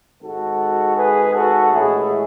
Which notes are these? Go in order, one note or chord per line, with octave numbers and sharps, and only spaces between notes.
G#1 G#2 G#3 F#4 A4
G#4 B4
F#4 A4
A1 A2 G#3 E4 G#4